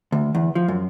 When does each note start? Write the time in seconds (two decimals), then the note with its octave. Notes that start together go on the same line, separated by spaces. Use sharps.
0.12 D2
0.35 E2
0.55 F3
0.68 F#2